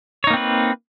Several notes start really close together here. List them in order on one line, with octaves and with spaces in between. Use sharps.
C#5 D#4 A#3 C4 B4